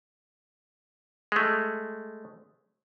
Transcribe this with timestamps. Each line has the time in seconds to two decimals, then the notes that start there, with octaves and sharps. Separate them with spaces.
1.32 G#3 A3